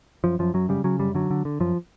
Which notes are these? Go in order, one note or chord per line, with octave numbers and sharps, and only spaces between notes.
F#2 F3
F#2 F3
F#2 F#3
C#3 G3
C#3 F#3
F#2 G3
D3 F#3
D3
D3
F#2 F3